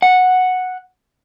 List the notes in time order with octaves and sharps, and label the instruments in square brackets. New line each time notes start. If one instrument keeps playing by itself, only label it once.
[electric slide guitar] F#5